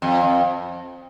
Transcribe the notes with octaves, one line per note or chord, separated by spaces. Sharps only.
F2
F2